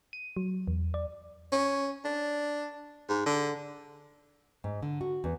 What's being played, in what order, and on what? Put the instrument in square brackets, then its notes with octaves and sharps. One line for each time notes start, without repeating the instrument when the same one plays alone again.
[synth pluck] D#7
F#3
E2
D5
[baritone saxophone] C#4
D4
G#2
D3
[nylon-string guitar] G#2
D3
F#4
E2